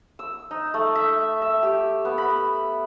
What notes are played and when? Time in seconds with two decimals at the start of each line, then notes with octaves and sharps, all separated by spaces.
0.19 E6
0.51 D#4
0.74 A3
0.95 E5
1.42 E5
1.63 G4
2.05 B3
2.18 B5